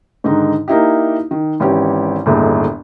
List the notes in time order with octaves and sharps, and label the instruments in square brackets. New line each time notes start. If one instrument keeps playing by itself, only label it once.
[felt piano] G#2 D3 D#3 D#4
A#3 D#4 E4 G4
D#3
G#1 E3 C#4 G4
G1 D#2 A2 G#3